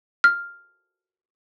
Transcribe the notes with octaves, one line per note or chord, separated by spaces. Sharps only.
F6